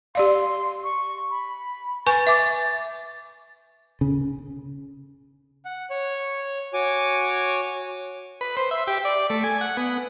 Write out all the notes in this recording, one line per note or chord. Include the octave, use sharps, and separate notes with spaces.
G4 D5 F5 C6
C#6
B5
B4 G#5 C#6 A6
E5 D6
C#3
F#5
C#5
F#4 C#5 G#5 D6
B4
C5
E5
G4
D5
A3
G#5
F#5
B3